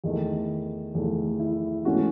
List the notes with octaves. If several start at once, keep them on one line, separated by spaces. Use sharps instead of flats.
E2 D#3 A3
E2 D#3 A3
E4
G#2 E3 A3 C#4 F#4